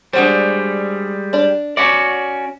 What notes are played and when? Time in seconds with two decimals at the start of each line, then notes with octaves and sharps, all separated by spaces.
0.13 G3 G#3 D4 F#4 C5
1.33 D4 D5
1.77 C#4 F#4 D5 F#5